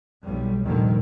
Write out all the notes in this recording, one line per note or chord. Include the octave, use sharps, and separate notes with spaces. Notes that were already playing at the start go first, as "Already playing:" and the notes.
B1 G3
F1 D2 A#2 D3 D#3 G3